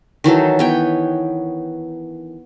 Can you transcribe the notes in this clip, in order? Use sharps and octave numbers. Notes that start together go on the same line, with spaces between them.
D#3 E3 F#3 A4
B3 C#5 G5